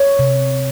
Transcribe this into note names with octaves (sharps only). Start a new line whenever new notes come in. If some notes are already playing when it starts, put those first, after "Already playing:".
Already playing: C#5
C3